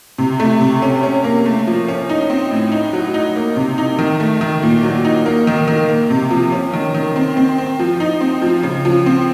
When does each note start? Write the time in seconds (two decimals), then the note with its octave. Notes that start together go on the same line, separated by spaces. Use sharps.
0.18 C3
0.40 A3
0.61 C3
0.82 C#4
1.03 C#4
1.24 A#3
1.46 A3
1.67 F3
1.88 C#4
2.10 D#4
2.30 C4
2.51 A2
2.72 D#4
2.93 F#3
3.14 D#4
3.36 A#3
3.56 C3
3.78 D#4
3.99 D#3
4.20 A3
4.41 D#3
4.63 A#2
4.83 F#3
5.05 D#4
5.26 A#3
5.47 D#3
5.68 D#3
5.89 A#3
6.10 C3
6.31 F3
6.52 C#4
6.73 D#3
6.94 D#3
7.16 C4
7.37 C4
7.58 C4
7.79 F3
8.00 D#4
8.21 C4
8.42 F3
8.63 C#3
8.85 F3
9.06 C4